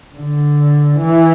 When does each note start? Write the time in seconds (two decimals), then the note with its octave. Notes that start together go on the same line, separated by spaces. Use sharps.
0.16 D3
0.99 E3